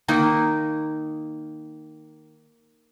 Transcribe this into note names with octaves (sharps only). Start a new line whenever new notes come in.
D#3 A#3 D#4